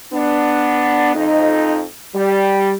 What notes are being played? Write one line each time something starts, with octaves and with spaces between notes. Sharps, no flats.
B3 D4
F2 D#4
G3